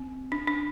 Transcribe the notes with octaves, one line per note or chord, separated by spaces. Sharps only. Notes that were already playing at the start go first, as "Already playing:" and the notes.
Already playing: C4
D4
D4